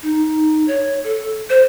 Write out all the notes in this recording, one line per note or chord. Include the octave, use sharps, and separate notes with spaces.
D#4
C#5
A4
C5